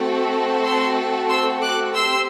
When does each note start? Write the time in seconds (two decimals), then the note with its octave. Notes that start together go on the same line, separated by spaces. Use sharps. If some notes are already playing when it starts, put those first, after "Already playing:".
Already playing: A3 C4 F#4 A4
0.64 C6 E6
1.29 C6 E6
1.62 D6 F#6
1.94 C4 G4 C6 E6